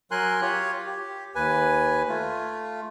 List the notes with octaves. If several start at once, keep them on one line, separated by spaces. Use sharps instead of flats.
F#3 A#4 G#5 C6 F#6
F4 G4 C#5
G4
D#2 B4 G#5
A3 F4